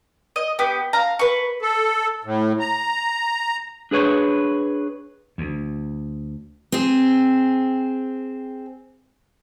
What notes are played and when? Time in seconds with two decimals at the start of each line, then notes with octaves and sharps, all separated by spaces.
0.36 D#5
0.59 B3 G4
0.93 F5 A#5
1.19 B4 C#6
1.62 A4
2.25 A2
2.60 A#5
3.91 D4 G#4 B4 C#5
5.38 D2
6.72 C4 G#4